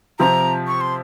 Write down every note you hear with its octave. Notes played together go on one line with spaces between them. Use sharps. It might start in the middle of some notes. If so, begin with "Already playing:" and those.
C3 F3 C4 A#5
C#6
C6